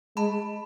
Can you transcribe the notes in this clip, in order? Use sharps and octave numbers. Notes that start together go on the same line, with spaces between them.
G#3 A5 B5